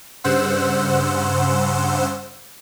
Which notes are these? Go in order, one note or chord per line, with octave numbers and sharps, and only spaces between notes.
G2 C#3 C5 F#5 E6